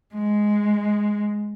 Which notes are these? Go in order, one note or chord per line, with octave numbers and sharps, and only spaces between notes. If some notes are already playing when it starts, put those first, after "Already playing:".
G#3